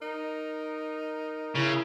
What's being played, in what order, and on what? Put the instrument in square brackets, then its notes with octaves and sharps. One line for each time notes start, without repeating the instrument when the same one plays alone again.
[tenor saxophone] D#4 [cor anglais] A#4
[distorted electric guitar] C#3 [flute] E4 [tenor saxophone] C#5